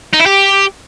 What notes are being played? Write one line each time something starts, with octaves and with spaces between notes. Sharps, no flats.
D#4
E4
G4